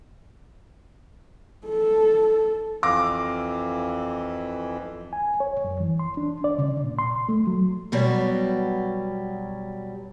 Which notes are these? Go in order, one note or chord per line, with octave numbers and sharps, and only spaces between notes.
A4
F2 E3 F5 D6 A#6
G#5
C#5
F#2
E3
C6
D4
D5
C#3
A#2
C6
A3
F#3
B2 F#3 G3